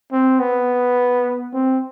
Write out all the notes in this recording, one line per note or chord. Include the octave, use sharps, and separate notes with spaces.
C4
B3
C4